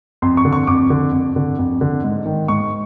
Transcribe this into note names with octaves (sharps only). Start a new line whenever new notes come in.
F2 C6
C#6
D3
C#6
F2 D6
D3
F2
D3
F2
D3
G#2
D#3
G#2 C#6